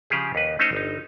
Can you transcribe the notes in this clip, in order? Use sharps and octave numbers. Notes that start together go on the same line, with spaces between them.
C#3 F3 G4 G#4
D#2 B4
A3 C#4 D#4 C5 C#5 D#5
G1 D#4